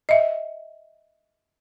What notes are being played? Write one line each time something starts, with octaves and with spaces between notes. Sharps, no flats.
D#5 E5